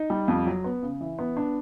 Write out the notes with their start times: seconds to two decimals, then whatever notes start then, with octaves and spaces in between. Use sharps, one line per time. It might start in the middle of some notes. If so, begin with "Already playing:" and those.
Already playing: D#4
0.10 G3
0.28 F2
0.47 F#3
0.64 B3
0.82 C#3
1.01 E3
1.19 B3
1.37 D4